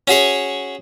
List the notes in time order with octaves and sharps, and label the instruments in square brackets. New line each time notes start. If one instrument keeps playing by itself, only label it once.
[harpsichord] C#4 F#4 G#4 C#5